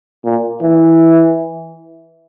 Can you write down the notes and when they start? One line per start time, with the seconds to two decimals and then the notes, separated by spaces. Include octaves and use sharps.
0.25 A#2
0.62 E3